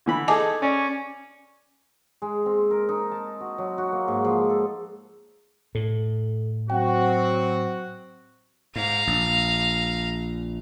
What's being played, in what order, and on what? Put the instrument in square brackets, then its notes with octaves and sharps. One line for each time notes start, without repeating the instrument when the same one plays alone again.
[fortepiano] D3 E3 B5
[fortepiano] D#4 G#4 A4 [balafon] G#5 A5 D6
[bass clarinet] C#4 [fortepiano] D5
[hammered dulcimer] G#3
C4
A#4
D#4
A5
F#4
F#3
F#4
A#3
G#2
F3
A4
[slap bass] A2 [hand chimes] A4
[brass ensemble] F#3 C4 F#4 [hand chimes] F#5 G5
[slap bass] G#2 [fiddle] F5 A#5
[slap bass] A#1